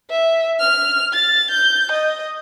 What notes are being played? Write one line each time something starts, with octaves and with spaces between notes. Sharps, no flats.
E5
F6
A6
G6
D#5